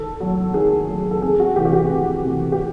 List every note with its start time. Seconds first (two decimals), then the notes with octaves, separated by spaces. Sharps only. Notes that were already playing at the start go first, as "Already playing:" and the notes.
Already playing: D#3 A4
0.20 F#3 A3
0.54 D#3 G#4
0.88 F#3 A3
1.11 A4
1.22 F2 G#4
1.40 F#4
1.56 C3 E3 A3 G4
1.65 F#4
1.73 G4
1.90 F2
2.24 C3 E3 A3
2.52 G4